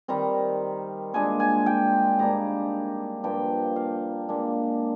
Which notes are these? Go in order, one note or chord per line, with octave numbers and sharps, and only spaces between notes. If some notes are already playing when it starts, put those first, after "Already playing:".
D#3 G3 C4 A#5
A#2 G#3 D4 G#5
G#5
G5
G#2 G3 A#3 D4 A#5
G2 F3 A#3 D4 G5
F5
A#2 G#3 D4